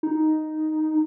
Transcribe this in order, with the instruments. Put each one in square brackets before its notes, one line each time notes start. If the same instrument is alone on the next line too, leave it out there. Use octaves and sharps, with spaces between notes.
[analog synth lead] D#4